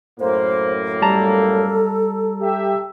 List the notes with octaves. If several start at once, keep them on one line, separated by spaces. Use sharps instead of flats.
F#2 A2 A#3 C5
G3 A4 A5 A#5
G4 E5